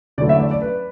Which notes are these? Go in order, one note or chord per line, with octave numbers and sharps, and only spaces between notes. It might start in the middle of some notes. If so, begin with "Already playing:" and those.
E2 D3 F#3 A3 E4 D5
E5
D5
D5
B4